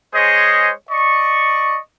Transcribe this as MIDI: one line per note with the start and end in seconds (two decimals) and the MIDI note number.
0.14 0.71 56
0.14 0.71 68
0.14 0.71 72
0.14 0.71 73
0.14 0.71 75
0.90 1.78 74
0.90 1.78 75
0.90 1.78 85